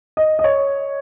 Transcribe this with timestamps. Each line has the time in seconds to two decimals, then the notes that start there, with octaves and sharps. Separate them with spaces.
0.17 D#5
0.39 D#5
0.44 C#5